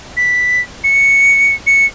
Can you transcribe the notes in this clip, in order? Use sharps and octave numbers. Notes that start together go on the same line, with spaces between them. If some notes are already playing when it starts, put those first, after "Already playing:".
B6
C#7
C#7